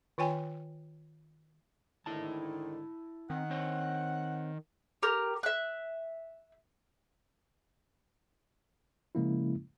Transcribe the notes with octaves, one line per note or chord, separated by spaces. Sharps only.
D#3 F4 C#5 G5 G#5
G#2 D3 D#3 E4 A5
D#3 C4 F#5
C4 C5 C#5
G4 A#4
E5 F#6
C#3 F3 G#3 A#3 C#4 E4